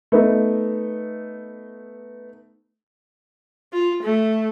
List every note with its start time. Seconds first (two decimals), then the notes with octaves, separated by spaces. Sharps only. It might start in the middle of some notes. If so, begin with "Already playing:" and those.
0.12 A3 B3 D#4
3.73 F4
4.03 A3